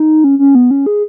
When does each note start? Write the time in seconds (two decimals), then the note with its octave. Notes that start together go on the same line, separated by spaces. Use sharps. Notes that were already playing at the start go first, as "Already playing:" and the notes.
Already playing: D#4
0.24 C#4
0.39 C#4
0.55 B3
0.71 C#4
0.86 G#4